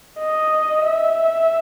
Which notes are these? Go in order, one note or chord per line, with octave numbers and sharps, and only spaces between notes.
D#5
E5